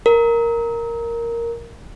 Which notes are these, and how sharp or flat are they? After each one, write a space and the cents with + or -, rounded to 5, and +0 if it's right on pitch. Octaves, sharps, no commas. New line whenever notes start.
A#4 +0